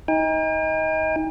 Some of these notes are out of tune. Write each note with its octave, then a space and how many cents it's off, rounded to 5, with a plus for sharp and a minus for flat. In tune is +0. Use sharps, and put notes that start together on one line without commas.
D#4 +25 G5 +45